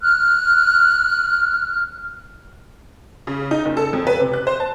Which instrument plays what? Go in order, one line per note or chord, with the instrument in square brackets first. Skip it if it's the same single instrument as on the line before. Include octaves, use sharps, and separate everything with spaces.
[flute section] F6 F#6
[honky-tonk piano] C#3
D#4
F#1
A4
F2
B4
C3
F#6
C5
A5